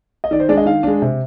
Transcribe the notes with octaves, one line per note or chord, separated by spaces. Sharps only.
D#5
D#3 D5
C5
G#3 D4 D5
D#5
D#3 F5
G#3 D4
C3